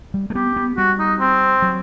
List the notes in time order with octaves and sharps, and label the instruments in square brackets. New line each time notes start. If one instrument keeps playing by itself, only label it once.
[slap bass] G3
A3
[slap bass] B3 [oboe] G4
[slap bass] B3
[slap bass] G3 [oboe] F#4
[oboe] D#4
C4
[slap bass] F#3